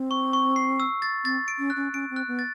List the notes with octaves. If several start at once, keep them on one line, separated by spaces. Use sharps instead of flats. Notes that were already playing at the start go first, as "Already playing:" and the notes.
Already playing: C4
C#6
C#6
C7
E6
A6
C4 A6
D7
C#4
F#6
C#4
C#4 D7
C4
F#6
B3
A6